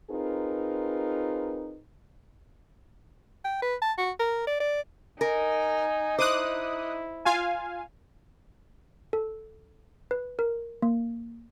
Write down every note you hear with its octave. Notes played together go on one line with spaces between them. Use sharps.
C4 D#4 F4 G#4 A#4 B4
G5
B4
A5
F#4
A#4
D5
D5
D#4 A#4 G#5
E4 C5 D6 D#6 F#6
F4 F5 G#5
A4
B4
A#4
A#3